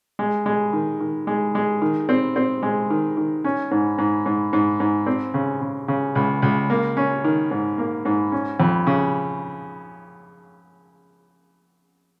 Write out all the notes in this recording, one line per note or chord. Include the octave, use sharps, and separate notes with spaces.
G#3
G#3
D#3
D#3
G#3
G#3
D#3
C4
C4
G#3
D#3
D#3
C#4
G#2
G#2
G#2
G#2
G#2
C4
C#3
C#3
C#3
C#2
C#2
A#3
C#4
D#3
G#2
A#3
G#2
C#4
F2
C#3